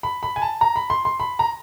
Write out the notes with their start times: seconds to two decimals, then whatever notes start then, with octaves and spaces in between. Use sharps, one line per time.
0.03 B5
0.23 B5
0.36 G#5
0.42 A5
0.61 A#5
0.76 B5
0.90 C6
1.05 C6
1.20 B5
1.39 A#5